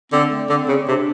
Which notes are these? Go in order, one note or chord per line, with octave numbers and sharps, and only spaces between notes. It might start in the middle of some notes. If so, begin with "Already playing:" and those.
D3 C4
A3
D3 C4
C#3
C3 D4